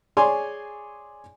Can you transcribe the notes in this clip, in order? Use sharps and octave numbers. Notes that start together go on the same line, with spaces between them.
G#4 C#5 D5 G#5 C6